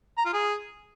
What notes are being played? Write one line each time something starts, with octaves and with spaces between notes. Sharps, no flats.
A#5
F4
G#4